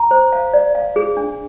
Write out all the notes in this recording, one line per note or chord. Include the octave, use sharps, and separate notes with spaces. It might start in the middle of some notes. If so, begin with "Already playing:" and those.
Already playing: A#5
C5
F5
D5
F5
G#4
D4